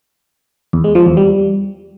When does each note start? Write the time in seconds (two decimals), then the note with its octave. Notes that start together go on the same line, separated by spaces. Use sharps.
0.73 E2
0.84 G#3
0.95 F3
1.06 E2
1.17 G3